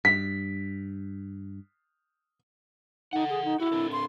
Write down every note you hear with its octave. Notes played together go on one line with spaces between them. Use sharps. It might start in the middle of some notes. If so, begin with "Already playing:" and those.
G2 B6
D#4 A4 F#5
G#4
D#4
E4 F#4 G4
C4 D4 A4
C6